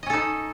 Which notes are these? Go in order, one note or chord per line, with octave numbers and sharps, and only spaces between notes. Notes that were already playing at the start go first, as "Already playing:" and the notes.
C#4 D#4 A4 D#5